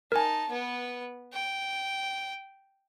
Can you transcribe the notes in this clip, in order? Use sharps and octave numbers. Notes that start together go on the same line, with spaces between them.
D#4 A#4 G#5 A5
B3 B4
G5